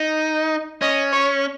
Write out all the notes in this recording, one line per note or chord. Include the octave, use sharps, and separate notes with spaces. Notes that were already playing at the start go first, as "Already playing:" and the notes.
Already playing: D#4
C#4 D#5
C#5